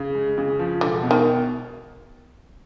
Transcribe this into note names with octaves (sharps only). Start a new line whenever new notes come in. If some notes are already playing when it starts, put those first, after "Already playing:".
Already playing: C#3
G#3
C#3
F3
E1 D3
B2
D#3